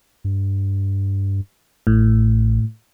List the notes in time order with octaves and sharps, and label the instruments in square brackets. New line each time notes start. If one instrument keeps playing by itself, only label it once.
[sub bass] G2
[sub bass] A1 [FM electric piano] A2